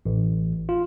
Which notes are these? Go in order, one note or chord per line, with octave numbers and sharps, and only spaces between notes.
A1
F4